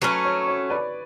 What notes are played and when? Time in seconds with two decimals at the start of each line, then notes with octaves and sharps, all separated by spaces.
0.02 F#3 A3 C#4 B4
0.25 C#5
0.48 C#5
0.70 B4 D5